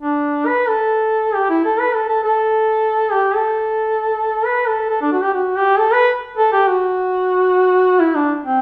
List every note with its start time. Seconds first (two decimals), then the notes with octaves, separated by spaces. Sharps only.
0.02 D4
0.47 B4
0.68 A4
1.35 G4
1.50 E4
1.65 A4
1.80 B4
1.94 A4
2.08 A4
2.24 A4
3.12 G4
3.35 A4
4.45 B4
4.67 A4
4.90 A4
5.01 D4
5.12 F#4
5.23 G4
5.34 F#4
5.56 G4
5.79 A4
5.93 B4
6.38 A4
6.53 G4
6.67 F#4
8.00 E4
8.15 D4
8.44 C4